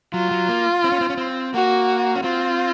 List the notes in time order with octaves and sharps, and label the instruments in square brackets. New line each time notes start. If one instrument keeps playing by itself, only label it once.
[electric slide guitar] F#3 [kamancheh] F4
[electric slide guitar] F#3
A#3
C4
C#4
C4
C#4
C4
[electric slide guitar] A#3 [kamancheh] F#4
[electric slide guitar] C#4
[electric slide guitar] C4 [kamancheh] F4